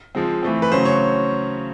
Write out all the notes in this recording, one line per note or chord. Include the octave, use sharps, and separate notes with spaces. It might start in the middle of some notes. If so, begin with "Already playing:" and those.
F3 G#3 C4
E3 A3 C4
B4
C#3 F#3 A3 C#4 C5
C#5